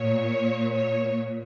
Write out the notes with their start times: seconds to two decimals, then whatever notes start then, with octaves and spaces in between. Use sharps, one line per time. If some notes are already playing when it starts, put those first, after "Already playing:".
Already playing: A#2 C#5
0.73 C#5